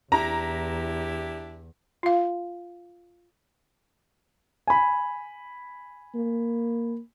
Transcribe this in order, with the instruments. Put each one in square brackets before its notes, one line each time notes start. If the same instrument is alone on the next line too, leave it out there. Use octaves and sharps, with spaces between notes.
[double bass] E2 [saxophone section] D4 E4 G4 [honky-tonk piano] A#5
[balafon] F4 F5
[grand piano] G#5 B5
[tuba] A#3